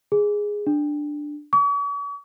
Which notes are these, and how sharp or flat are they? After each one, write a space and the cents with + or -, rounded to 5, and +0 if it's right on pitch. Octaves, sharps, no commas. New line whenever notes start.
G#4 -5
D4 +5
C#6 +45